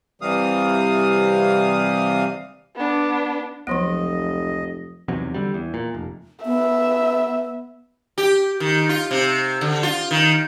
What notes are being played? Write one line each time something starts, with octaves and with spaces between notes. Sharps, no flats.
C3 E3 G3 F5 D#6
B3 D4
F1 C#2 F3 F#3 B3 D#5
B1 E2 C3 F#3
D3 G3
E2
A#2
F1
B3 E5
G4
D#3
F4
C3
D3
F4
D#3